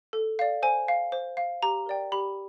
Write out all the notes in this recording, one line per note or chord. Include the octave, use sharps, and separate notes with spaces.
A4
D5 F5
C5 G#5
F5
C5
F5
G4 A#5
A#4 D5 G5
G4 B5